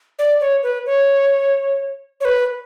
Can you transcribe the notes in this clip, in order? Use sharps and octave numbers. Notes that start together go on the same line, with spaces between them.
D5
C#5
B4
C#5
C#5
B4